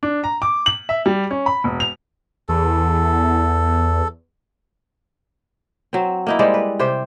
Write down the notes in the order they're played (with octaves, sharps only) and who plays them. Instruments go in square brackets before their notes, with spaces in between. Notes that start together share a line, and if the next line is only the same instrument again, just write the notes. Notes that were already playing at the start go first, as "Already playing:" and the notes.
[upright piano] D4
A#5
D6
F#7
E5
G3
C#4
B5
E1
F7
[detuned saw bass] E2 [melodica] A4
[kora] F#3 C4
A#3 D#4 E4
G3 G#3 C5 D5
B4
C3 G4 C5